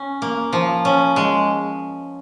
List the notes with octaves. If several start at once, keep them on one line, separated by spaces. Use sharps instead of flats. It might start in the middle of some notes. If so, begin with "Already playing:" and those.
Already playing: C#4
A#3
F3
C#4
G#3